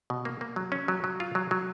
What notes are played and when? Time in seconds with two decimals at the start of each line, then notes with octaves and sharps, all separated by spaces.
0.10 B2
0.25 A#3
0.41 A#3
0.56 F#3
0.72 C#4
0.88 F#3
1.04 F#3
1.20 F4
1.35 F#3
1.51 F#3